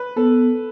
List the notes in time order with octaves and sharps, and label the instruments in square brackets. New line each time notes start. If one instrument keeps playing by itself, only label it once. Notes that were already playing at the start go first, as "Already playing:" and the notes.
Already playing: [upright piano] B4
[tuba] B3 [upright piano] A4